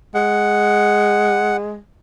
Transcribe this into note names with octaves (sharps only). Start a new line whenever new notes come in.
G#3 F#5